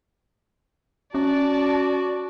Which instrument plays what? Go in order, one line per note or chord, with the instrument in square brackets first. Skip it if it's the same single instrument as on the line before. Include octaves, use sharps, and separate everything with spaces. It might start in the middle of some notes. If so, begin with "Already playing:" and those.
[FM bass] C#4 [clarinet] F#4 [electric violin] D5 A5